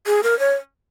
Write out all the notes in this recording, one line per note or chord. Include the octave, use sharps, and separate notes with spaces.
G#4
A#4
C#5